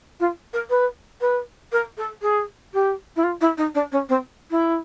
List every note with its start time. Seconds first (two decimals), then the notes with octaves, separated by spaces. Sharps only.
0.20 F4
0.53 A#4
0.70 B4
1.21 B4
1.72 A#4
1.97 A4
2.22 G#4
2.74 G4
3.16 E4
3.24 F4
3.41 E4
3.58 D#4
3.75 D4
3.92 C#4
4.09 C4
4.51 E4